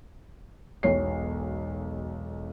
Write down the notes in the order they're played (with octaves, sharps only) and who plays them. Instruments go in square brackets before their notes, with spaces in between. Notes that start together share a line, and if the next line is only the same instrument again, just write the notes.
[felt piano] E1 B1 C#5 C7